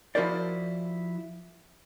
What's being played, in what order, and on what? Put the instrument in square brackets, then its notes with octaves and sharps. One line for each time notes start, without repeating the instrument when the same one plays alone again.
[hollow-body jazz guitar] F3 E4 F#4 A#4 C5 D5